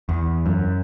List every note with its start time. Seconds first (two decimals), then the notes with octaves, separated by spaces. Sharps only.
0.09 E2
0.46 F#2